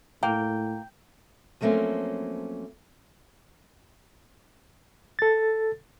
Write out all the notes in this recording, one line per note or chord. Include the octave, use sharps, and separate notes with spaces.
A2 A#3 G5
F3 F#3 A3 A#3 C4 C#4
A4 A6